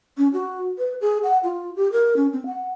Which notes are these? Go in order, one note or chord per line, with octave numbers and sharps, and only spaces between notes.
C#4
F#4
B4
G#4
F#5
F4
G4
A#4
C#4
C4
F#5